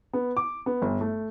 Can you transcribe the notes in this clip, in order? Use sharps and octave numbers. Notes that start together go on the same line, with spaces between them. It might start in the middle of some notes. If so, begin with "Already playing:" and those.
B3
D6
B3
G1
A3